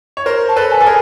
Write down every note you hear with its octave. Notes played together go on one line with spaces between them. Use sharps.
C#5
A#4 C5
A5
A4 B4
G#5
A4
G#4 A#4